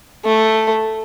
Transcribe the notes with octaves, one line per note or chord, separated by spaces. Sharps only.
A3